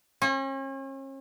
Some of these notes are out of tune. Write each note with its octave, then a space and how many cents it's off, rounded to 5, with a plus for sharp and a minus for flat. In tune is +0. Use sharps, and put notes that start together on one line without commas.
C#4 -40